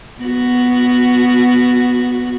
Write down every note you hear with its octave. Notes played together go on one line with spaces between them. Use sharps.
B3 F#4